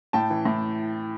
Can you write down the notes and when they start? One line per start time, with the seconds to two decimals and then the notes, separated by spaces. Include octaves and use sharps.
0.13 A2 G5 A5
0.30 E3
0.45 A2